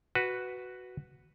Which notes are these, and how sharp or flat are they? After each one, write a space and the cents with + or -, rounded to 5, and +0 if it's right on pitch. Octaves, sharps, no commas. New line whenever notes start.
F#4 +0 B4 +0